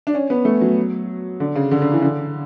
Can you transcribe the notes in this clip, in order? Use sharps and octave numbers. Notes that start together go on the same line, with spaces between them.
D4
C#4
B3
A3
F#3
D3
C#3
D3
D3
E3
D3